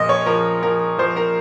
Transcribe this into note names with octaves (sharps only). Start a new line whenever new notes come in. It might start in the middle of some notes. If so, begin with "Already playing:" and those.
Already playing: A#2 F3 D#5
C#5
F3 A#4
F3 A#4
F3 C5
A#4